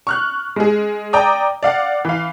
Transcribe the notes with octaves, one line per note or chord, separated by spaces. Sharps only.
C#6 F6 F#6
G#3 G#4
D5 G5 A#5 D6 D#6
D5 F5 F#5
E3 F5